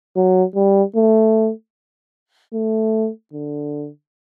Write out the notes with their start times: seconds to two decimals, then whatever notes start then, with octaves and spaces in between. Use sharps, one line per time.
0.16 F#3
0.55 G3
0.95 A3
2.54 A3
3.33 D3